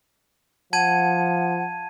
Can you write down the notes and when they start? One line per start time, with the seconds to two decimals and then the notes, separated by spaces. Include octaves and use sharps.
0.73 F3 F#5 A5 G#6 D#7